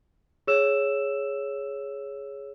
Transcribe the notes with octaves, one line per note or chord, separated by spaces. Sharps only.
G#4 C#5 E6 E7